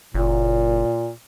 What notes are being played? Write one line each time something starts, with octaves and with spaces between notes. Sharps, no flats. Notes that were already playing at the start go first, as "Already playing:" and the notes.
F#1 A#2